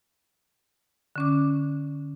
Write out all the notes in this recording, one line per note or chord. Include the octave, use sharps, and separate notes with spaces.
D3 C#4 D6